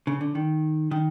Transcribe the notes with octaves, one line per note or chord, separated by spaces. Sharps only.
C#3
D3
D#3
D#3